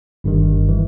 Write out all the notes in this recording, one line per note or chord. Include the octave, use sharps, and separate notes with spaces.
G1 G2 D#3
E3